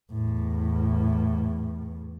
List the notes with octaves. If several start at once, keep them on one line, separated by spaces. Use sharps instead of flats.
E2 A2